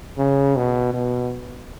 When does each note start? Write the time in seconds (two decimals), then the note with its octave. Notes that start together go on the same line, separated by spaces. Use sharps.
0.18 C#3
0.56 B2
0.94 B2